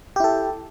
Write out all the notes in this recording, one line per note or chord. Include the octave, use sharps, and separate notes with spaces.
E4 G4 A4